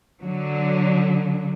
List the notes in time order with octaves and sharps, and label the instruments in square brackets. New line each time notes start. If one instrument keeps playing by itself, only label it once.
[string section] D3 F#3